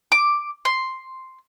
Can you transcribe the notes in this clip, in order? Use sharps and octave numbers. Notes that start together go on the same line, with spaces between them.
D6
C6